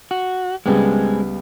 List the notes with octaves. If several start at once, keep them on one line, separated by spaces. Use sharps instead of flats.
F#4
C#2 G3 G#3 B3 C4 G#4